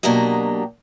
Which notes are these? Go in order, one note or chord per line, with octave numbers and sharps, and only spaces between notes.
B2 F#3 A#3 D4 G4 D#5